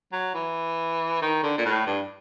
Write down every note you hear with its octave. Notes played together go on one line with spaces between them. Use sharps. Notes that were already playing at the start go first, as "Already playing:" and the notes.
F#3
E3
D#3
D3
A#2
A2
G2